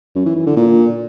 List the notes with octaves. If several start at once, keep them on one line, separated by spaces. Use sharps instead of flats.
F#2
E3
E3
D3
A#2